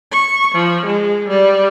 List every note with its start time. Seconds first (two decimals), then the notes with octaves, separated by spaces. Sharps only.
0.12 C#6
0.55 F3
0.86 G#3
1.29 G3